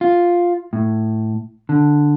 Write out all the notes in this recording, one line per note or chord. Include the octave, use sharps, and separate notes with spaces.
F4
A2
D3